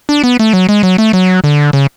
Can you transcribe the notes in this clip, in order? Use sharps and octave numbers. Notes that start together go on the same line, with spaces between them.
D4
B3
A3
F#3
G#3
F#3
A3
F#3
D3
C#3